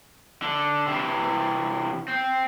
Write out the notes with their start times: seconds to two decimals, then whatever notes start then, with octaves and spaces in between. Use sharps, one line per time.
0.42 D3
0.87 C3 E3
2.08 C4